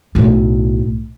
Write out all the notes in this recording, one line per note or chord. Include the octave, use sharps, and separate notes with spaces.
B1 A2